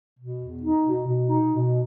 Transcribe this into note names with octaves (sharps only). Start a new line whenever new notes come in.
B2
E2
D#4
B2
B2
D#4
B2